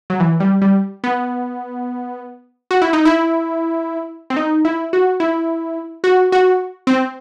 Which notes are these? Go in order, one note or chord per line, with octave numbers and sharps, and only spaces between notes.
F#3
E3
G3
G3
B3
F#4
E4
D#4
E4
C4
D#4
E4
F#4
E4
F#4
F#4
C4